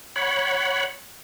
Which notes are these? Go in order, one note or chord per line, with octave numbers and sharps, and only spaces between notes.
C#5 F#5 B5